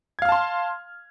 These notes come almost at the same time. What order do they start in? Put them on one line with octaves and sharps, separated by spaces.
G#6 F5 F6 A5 C6